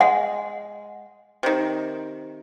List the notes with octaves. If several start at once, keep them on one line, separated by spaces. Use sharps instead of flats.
G#3 F#5
C3 D#3